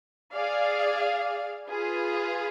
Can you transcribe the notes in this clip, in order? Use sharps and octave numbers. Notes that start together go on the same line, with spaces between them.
G#4 D5 F5
F4 G#4 B4 F5